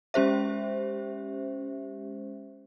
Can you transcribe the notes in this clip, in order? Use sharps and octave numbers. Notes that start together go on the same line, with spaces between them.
G#3 C#4 G4 C5 E5